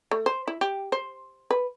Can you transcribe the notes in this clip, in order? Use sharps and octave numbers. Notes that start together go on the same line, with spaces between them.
A3
C5
E4
G4
C5
B4